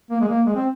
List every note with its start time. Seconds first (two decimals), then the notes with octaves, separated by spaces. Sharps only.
0.11 A#3
0.21 G#3
0.28 A#3
0.46 G#3
0.55 C4